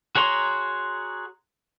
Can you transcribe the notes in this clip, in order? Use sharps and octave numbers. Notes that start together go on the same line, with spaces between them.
F#4 G#4 C#5 A#5 C6